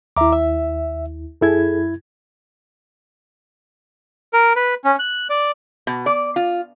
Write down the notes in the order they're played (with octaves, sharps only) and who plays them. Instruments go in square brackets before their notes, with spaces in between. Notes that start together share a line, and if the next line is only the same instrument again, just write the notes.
[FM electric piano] D#2 E4 [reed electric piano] E5 A#5 D6
[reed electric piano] E5
[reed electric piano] F#2 E4 G#6 [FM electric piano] G#4 A4
[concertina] A#4
B4
C#4
F#6
D5
[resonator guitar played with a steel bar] B2
D5
F4